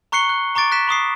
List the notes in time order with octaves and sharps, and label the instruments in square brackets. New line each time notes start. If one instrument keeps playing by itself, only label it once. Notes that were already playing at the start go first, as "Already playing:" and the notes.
[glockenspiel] A#5 C#6 F#6 C7 C#7 G7
F#6
A#5 C#6 D6 A6 D7
F#6 B6 E7
B5 C#6 D#6 C7